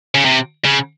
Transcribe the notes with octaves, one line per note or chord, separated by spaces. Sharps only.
C#3
C3
C#3